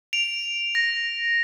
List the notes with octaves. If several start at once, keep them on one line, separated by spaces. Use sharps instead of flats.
D7 F7
A#6